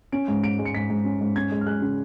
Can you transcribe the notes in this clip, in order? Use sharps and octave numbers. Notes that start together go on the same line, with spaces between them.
C#4 D7
G#2
G#2 D7
G#3
C#7
G#2 B6
G#2
C#4
G#2
C#4 G#6
G#3
F6
G#3 F#6
C#3